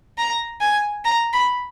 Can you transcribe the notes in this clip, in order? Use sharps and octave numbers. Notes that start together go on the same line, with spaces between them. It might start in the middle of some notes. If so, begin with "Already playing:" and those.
A#5
G#5
A#5
B5